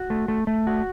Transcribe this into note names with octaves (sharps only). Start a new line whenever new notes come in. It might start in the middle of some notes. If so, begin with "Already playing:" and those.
Already playing: F#4
A3
A3
A3
F#4